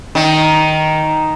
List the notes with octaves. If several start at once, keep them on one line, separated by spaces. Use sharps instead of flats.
D#3